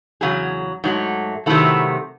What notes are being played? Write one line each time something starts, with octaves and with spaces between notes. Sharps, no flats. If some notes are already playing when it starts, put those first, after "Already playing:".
E2 C#3 F#3 G#4
G#2 F#3 A3
C3 D#3 F#3 A3 E4